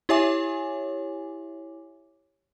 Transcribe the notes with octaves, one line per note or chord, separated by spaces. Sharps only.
E4 G4 C#5 E5 G#5 D6